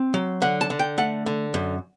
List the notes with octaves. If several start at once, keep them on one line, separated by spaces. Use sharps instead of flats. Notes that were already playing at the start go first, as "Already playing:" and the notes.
Already playing: C4
F#3
D3 F#5
A5
D3
G5
A3 F#5
D3
F#2